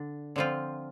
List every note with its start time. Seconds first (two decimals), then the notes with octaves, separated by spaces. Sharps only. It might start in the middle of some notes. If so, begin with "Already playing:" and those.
Already playing: D3 D4
0.36 D3 F3 C4 F4